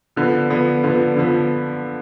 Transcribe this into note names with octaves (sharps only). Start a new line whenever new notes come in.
D3 F3 B3
D3 F3 B3
D3 F3 B3
D3 F3 B3